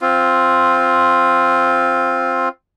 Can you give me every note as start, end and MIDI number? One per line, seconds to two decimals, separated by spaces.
0.01 2.49 60
0.01 2.49 65